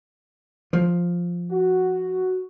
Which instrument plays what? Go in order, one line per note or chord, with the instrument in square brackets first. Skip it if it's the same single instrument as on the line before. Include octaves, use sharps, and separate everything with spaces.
[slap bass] F3
[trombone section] F#4